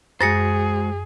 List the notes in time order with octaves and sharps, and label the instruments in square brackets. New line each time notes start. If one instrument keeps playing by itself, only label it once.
[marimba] F#2 [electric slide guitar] G#3 F#4 C5 [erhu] G#4 [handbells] A6 A#6 C#7